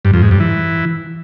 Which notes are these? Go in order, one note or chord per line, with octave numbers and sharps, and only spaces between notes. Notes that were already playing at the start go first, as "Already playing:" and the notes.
G2
F2
G#2
G2
E3